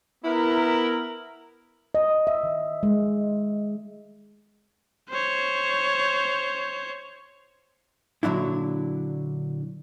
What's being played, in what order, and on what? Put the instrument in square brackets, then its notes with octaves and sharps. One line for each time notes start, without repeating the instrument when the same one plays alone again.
[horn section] B3 E4 A#4
[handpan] D#5
E5
D#3
G#3
[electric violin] C5 C#5
[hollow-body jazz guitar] A#2 D3 F#3 D4 E4